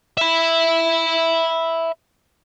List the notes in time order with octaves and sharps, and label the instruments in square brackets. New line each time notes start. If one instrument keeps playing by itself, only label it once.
[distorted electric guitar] E5 B5